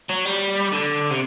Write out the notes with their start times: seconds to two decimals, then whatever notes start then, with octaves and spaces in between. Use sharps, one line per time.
0.09 F#3
0.25 G3
0.72 D3
1.10 C3